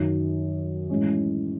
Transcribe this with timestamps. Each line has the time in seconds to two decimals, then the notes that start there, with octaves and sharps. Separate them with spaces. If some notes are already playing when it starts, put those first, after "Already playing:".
Already playing: F#2 D#3 F#3
0.90 A2 E3 G#3 C#4